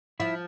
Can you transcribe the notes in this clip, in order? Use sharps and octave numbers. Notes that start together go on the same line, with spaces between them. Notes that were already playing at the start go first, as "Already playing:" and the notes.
F3 E4